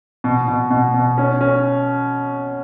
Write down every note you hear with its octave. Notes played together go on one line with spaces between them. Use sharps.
B2
B2
B2
B2
C#4
C#4